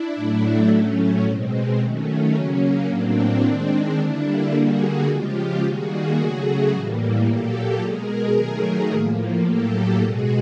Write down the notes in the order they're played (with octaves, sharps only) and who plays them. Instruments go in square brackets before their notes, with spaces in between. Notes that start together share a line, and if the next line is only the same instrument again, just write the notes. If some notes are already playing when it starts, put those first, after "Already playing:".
Already playing: [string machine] D4 E4
A2 F#3 A3
A2 F#3 A3 C#4
B2 G#3 C4
D#3 F#3 A3 C#4
C#3 F#3 A#3
A2 F#3 A#3 C4 D4
D#3 G#3
D3 G3 A#3 D4 E4
D3 G3 A#3 F#4 G#4
C#3 F3 G#3 F4 G4
D#3 G3 A#3 F#4 G#4
C#3 F#3 A3
A2 E3 G3 A#3
A#2 F#3 A#3 G4 A4
B2 G#3 G#4 A#4
D#3 F#3 A3
A2 F3 A#3
A2 F#3 A#3 G4 A4
B2 G#3 F#4 G#4